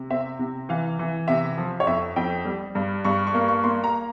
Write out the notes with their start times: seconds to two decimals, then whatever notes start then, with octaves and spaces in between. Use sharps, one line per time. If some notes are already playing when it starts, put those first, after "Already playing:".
Already playing: C3
0.10 C4 E5
0.39 C3
0.69 E3 F5
0.99 E3
1.28 C3 E5
1.58 F3
1.80 C#5
1.87 F2 E5
2.16 F2 G5
2.45 G3
2.75 G2
3.05 G2 C#6
3.27 C#6
3.34 A#3
3.48 C#6
3.64 A#3 C6
3.84 A#5